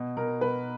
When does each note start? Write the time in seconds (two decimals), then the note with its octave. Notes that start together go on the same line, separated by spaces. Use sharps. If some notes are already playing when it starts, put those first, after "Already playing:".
Already playing: B2
0.17 B2 A#4
0.41 B2 B4